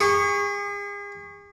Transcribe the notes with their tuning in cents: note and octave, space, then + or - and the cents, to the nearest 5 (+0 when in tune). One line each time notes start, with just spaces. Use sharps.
G#4 -40 C#6 +0